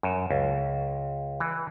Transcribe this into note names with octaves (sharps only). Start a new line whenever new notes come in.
F#2
C#2
E3